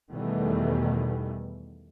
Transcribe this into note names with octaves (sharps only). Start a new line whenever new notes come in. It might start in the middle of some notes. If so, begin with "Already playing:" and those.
E2 B2 D#3 E3 G3 A3